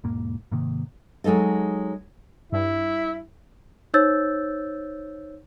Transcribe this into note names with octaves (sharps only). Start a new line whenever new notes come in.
E1 G#2 A#3
G#2 C3 D#3 A#3
F#3 G#3 D#4 A4 D#5
G2 E4
D#4 C5 C#5 E6 G6 A6